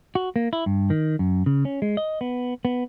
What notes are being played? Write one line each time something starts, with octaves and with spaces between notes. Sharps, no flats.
F#4
A#3
E4
G2
D#3
F#2
C#3
C#4
G#3
D#5
B3
B3